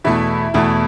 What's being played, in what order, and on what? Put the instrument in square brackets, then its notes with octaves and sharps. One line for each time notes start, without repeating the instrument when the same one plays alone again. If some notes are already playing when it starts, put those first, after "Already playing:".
[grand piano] E2 B2 A3 [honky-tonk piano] E4
[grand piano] E2 B2 A3 [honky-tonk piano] E4